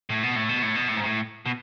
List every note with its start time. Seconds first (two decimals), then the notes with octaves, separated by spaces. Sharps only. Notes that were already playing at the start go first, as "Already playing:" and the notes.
0.10 A2
0.23 B2
0.36 A2
0.49 B2
0.62 A2
0.75 B2
0.88 A2
0.97 G#2
1.04 A2
1.46 B2